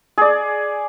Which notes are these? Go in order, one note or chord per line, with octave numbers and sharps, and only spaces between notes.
G#4 D5